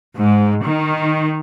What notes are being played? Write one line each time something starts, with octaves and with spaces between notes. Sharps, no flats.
G#2
D#3